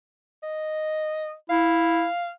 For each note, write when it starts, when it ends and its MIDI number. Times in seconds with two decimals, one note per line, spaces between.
0.43 1.34 75
1.50 2.07 64
1.50 2.31 77